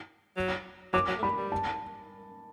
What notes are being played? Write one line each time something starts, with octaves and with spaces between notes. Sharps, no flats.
F#3
F#3 D6
F#3
A3
G3 B5
G3
A5